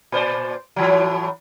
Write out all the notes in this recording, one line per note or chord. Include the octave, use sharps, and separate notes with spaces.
A#2 C5 D5
A2 E3 F#3